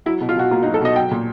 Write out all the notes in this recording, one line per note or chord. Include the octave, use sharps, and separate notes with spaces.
F#3 E4
B2
F4
B2 F#4
A#3 F4
D#4
F#3
A4
B2 D#5
F#3 G5
A#2